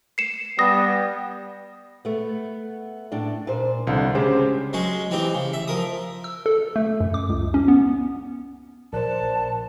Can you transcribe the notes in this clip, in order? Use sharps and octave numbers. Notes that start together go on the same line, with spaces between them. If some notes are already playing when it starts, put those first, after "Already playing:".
C7 C#7 E7
G3 B3 D#6 A#6
A3 B3
A2 D4
A#2 C5
C2 B2 D3 F3
C#3 G#3 G4 C5
F#3 G#3 C#4 G#4
E3 C4 D#4 G4
C#3
E5
F3 A#4 D#6
E6
A4
A3
F#2
D6
C#2
C#4
B3
A#1 A#4 C5 D5 A5 F#6